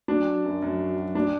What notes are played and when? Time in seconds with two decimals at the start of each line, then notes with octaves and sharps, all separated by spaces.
0.08 F#3 D4
0.27 F#3
0.45 F#2
0.62 F#2
0.79 F#3
0.96 F#3
1.15 D4